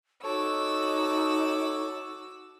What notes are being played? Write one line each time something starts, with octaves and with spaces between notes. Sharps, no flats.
D#4 F#4 A4 C#5 D6 E6